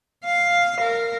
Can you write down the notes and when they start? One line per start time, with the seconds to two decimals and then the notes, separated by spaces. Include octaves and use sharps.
0.25 F5
0.81 A#4